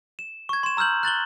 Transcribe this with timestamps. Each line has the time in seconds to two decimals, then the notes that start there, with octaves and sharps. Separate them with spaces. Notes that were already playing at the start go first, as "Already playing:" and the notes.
0.19 E7
0.49 C#6 G#6
0.63 C6 E7
0.77 A#5 E6 F6 G6 F#7
1.03 F#6 A6 F#7 G7